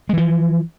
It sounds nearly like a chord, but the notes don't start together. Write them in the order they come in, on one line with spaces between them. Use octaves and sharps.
G#3 E3 F3